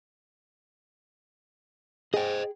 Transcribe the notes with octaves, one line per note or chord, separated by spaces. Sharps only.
G#4 C5 D#5 G5